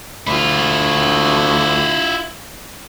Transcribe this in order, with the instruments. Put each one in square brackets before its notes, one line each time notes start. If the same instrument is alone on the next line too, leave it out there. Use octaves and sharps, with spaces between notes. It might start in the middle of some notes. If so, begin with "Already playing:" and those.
[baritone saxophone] D2 [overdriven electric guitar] E4 F4